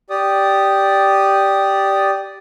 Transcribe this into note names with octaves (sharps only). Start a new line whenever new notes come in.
G4 D5 D#6